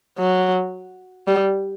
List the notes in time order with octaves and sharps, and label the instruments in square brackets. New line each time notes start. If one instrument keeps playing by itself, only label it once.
[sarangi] F#3
G3